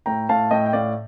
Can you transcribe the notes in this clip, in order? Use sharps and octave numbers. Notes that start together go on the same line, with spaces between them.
A2 G5 A#5
A2 F5 A5
A2 D#5 G5
G5
A2 D5 F5